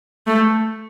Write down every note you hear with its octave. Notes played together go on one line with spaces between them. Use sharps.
A3